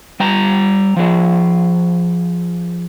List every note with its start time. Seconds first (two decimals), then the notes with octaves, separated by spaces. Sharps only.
0.20 G3 G5 A#5
0.97 F3 G#4